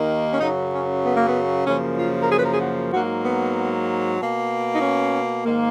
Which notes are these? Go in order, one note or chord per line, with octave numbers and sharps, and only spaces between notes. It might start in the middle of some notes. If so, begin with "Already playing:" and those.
Already playing: D#2 D#3 A#3
C#4
F#2 C#3 F#3 D#4
C#4
B3
A#3
B3
F#2 C#3 F3 A#3 C#4
F4
A#4
G#4
B4
A#4
G#4
F#4
G#2 F#3 A#3 F#4
B3
B2 A#3
D#4
C#4
G#2 D#3 A#3